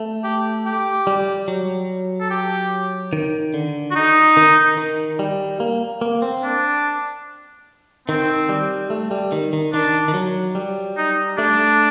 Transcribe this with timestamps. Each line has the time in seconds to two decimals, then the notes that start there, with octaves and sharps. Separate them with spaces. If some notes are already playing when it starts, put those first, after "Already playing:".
Already playing: A3
0.24 G4
0.66 G4
1.07 G3
1.48 F#3
2.20 A4
2.31 G4
3.13 D#3
3.54 D3
3.91 F#4
3.96 D#4
4.37 D#3
4.78 D#3
5.19 G3
5.60 A#3
6.01 A#3
6.22 C4
6.43 D4
8.08 D#3 C4
8.49 G3
8.90 A3
9.11 G3
9.32 D#3
9.53 D#3
9.73 D#3 D4
10.08 D#3
10.14 F#3
10.55 G3
10.97 D#4
11.38 A3 D4